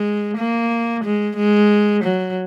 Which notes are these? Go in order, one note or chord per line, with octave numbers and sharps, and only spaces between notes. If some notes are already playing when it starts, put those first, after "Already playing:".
Already playing: G#3
A#3
G#3
G#3
F#3